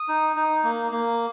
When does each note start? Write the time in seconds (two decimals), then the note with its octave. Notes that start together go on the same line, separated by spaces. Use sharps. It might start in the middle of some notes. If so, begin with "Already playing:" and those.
Already playing: D#6
0.08 D#4
0.36 D#4
0.64 A#3
0.92 A#3